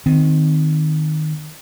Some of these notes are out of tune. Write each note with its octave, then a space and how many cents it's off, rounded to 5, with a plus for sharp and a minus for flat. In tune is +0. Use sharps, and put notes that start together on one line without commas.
D#3 -10 C4 -25